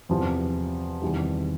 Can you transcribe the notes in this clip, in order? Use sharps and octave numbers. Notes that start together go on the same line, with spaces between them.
E2 C3 F3
E2 C3 D#3 G3